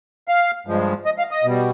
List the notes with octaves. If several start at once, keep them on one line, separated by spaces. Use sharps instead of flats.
F5
G2 F3 G#3
D#5
F5
D#5
B2 G3